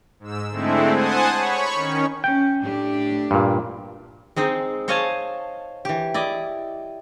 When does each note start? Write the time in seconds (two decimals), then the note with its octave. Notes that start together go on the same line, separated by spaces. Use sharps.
0.20 G#2 E6
0.50 D3 G#3 A3 C4 E4
0.93 C5 F#5 G#5 A5 D#6
1.35 C#5 B5 C#6
1.74 D#3 C#4
2.24 C#4 G5
2.62 A2 D4 G4
3.31 G2 A#2
4.36 G#3 C4 D#4 C5
4.88 C5 C#5 D#5 F5 G#5 A5
5.85 E3 G4
6.14 E4 D5 D#5